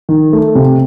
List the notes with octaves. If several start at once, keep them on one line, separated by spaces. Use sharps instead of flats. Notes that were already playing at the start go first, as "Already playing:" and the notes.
D#3
A3
C3